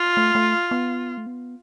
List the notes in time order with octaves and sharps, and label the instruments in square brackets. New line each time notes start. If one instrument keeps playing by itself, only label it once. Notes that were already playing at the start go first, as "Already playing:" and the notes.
Already playing: [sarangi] F4
[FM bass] A3
A3
B3
A3
B3